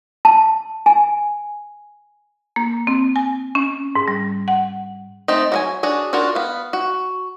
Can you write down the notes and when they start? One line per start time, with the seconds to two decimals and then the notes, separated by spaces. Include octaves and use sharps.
0.25 A5
0.86 G#5
2.56 A#3
2.87 C4
3.16 G#5
3.55 C#4
3.95 G#2
4.08 G3
4.48 F#5
5.28 A3 C4 D#4
5.52 F#3 A#4 G#5
5.83 D4 F#4 G#4 C#5
6.13 D4 F4 F#4 A#4
6.35 B3 F5
6.73 F#4